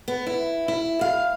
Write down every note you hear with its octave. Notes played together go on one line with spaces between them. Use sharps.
B3
E4
E4
F5